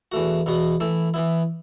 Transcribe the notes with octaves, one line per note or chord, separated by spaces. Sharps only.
E2 E3 A3 F#4
E2 B2 B3 F#4
E3 A3 E4
E3 B3 E4